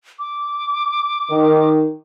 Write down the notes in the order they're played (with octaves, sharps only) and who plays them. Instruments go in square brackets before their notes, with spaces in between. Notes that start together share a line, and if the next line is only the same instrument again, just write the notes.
[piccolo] D6
[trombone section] D#3